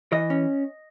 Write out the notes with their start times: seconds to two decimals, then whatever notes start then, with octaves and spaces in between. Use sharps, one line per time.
0.12 E3 D#5
0.30 C#4